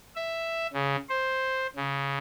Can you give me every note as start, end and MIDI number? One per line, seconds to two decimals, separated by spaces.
0.16 0.67 76
0.73 0.96 49
1.09 1.67 72
1.76 2.18 49